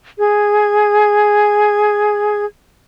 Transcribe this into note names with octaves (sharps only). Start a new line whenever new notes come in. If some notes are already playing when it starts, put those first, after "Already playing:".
G#4 G#6